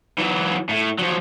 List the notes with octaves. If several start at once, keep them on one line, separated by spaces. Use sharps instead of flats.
E3 F#3
A2
F3 F#3